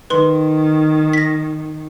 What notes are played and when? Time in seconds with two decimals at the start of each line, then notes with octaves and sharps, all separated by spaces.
0.10 D#3 B4 C6
1.13 A#6 B6